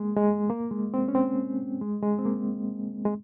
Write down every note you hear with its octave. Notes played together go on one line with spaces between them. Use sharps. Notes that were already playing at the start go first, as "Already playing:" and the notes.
Already playing: G#3 A#3
G#3
A#3
G#3
C4
C#4
C4
G#3
G#3
C4
A#3
G#3